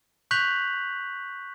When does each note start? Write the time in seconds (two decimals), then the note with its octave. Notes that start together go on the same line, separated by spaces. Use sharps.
0.31 C#6 F#6 G6 B6 F7 F#7